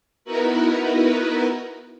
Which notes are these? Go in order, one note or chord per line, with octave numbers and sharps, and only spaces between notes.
B3 D#4 E4 F#4 A#4 B4